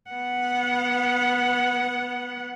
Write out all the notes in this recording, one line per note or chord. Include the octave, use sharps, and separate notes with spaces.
B3 F#5